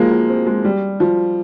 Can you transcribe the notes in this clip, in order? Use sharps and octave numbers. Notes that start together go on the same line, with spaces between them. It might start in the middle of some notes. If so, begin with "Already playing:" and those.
Already playing: F3 G#3 A#3
A#3
C4
G#3
G3
F3